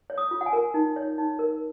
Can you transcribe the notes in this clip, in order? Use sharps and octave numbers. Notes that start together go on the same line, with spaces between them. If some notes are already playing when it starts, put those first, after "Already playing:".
C#5
D#6
F4
F#5
G#5
A#4
D#4
C#5
D#4
A#4